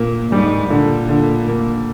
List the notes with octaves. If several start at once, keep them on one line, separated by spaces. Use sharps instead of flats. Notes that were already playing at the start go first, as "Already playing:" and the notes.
Already playing: A#2 A#3
G#2 G3
A#2 D3
D3
A#3